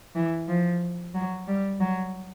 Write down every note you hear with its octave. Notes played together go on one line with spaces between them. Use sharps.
E3
F3
F#3
G3
F#3